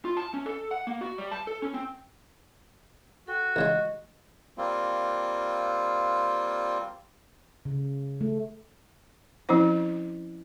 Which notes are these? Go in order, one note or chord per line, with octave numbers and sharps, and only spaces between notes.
F4
A5
C#4
A4
F#5
A#3
F#4
G3
A5
A4
C#4
C4
F#4 A4 G5
A1 C#3 G#3 D#5
G3 A#3 C4 F4
C#3
A3
F3 C4 C#4 E4 C5